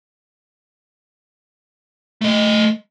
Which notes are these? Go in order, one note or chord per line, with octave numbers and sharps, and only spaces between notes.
A3 D#5